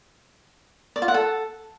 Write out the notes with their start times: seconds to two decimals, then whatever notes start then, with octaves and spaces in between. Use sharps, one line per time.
0.96 D5
1.02 F4
1.08 F#5
1.14 A4